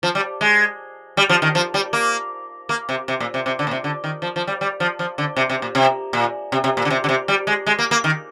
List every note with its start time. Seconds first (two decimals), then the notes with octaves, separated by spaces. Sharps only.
0.03 F3
0.15 G3
0.41 G#3
1.17 G3
1.29 F3
1.42 D#3
1.55 F3
1.74 G3
1.93 A#3
2.69 A#3
2.89 C3
3.08 C3
3.20 A#2
3.34 C3
3.46 C3
3.59 D3
3.67 A#2
3.71 C3
3.84 D3
4.04 D#3
4.22 F3
4.36 F3
4.47 G3
4.61 G3
4.80 F3
4.99 F3
5.18 D3
5.36 C3
5.50 C3
5.62 A#2
5.75 C3
6.13 A#2
6.52 C3
6.64 C3
6.77 A#2
6.85 D3
6.90 C3
7.04 D3
7.09 C3
7.28 G3
7.47 G#3
7.67 G#3
7.79 A#3
7.91 A#3
8.04 D#3